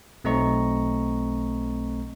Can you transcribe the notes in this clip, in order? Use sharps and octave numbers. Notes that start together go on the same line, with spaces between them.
B1 A3 C4 D#5 A#5 C#6